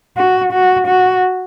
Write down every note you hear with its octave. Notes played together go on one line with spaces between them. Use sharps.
F#4
F#4
F#4